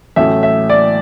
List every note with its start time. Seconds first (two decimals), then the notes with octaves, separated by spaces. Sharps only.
0.16 A1 A2 F#3 A3 E5
0.43 E5
0.69 D5